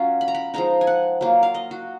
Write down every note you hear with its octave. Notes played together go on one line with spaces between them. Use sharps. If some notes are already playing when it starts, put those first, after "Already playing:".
Already playing: F#3 C#4 F4
B5
A#5
B5
F3 G#3 D#4 A#5
G#5
F#5
F#3 A#3 F4
F5
D#5
F#4